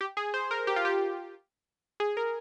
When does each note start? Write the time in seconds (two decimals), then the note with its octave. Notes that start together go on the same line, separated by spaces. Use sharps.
0.01 G4
0.17 G#4
0.34 C5
0.51 A#4
0.67 G4
0.76 F4
0.85 G4
2.00 G#4
2.17 A#4